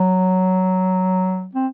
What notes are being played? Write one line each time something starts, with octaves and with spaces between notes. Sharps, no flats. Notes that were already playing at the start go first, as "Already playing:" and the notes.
Already playing: F#3
C4